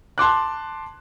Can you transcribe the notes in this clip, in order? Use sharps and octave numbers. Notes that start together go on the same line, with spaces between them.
A5 C6 D6 F#6